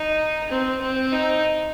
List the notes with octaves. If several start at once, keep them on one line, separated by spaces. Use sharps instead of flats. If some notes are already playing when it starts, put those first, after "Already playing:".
Already playing: D#4
C4
C4
D#4